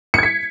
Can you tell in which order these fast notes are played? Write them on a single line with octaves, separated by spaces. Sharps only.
C#7 G#6 B6